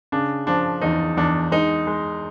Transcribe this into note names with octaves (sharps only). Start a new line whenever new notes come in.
C#3 D4
F3 D4
E2 D#4
E2 D4
G#3 D#4
G#3